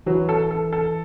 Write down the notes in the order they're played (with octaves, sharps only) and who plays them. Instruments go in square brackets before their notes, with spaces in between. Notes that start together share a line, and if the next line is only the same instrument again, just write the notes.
[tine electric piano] E3 [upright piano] F#3
[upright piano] A4
A4
A4